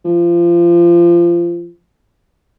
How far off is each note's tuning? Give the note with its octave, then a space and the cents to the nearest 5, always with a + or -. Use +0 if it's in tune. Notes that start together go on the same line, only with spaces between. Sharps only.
F3 -25